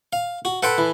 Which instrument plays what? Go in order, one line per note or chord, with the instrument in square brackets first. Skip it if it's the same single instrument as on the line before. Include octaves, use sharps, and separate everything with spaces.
[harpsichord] F5
F#4
[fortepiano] A4 B4 [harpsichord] F#5 G5 C6
[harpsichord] E3